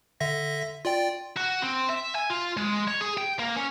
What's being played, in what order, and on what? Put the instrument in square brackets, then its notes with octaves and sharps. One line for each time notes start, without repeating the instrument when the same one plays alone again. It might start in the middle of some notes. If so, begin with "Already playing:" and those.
[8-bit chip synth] D3 E5 A#6
F4 D5 G5
[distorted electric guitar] F#4
C4
E5
G#5
F4
G#3
C#5
G#4
G5
A#3
C#4